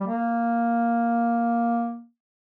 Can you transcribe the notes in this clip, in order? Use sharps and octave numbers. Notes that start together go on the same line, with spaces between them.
G3
A#3